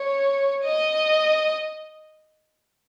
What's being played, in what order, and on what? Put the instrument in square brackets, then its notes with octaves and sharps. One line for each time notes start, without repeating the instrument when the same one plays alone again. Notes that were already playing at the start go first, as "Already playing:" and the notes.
Already playing: [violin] C#5
D#5